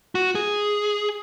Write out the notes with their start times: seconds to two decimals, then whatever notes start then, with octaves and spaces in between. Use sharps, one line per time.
0.15 F#4
0.35 G#4